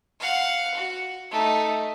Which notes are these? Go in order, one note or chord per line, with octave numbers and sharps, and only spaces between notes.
F5 F#5
F#4
A3 D#4